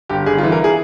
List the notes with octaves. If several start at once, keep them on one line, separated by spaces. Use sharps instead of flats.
G1 G4
G1 G#4
F4
E3
A#4
E3 G#4